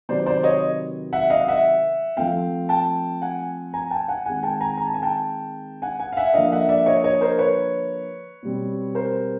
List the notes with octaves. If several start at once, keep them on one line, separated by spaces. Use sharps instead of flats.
C3 D#3 F#3 B3 C5 D5
C5 D5
C#5 D#5
E5 F#5
D#5 F5
E5 F#5
F3 A3 C4 F5 G5
G5 A5
F#5 G#5
G#5 A#5
G5 A5
F#5 G#5
D#3 G#3 C4 F#5 G#5
G5 A5
G#5 A#5
A#5
A5
G#5
G5 A5
F#5 G#5
F#5 G#5
F5
E5 F#5
D3 F3 A#3 D4 D#5 F5
E5 F#5
D5 E5
C#5 D#5
C#5 D#5
A#4 C5
B4 C#5
B2 G3 C4
A#4 C5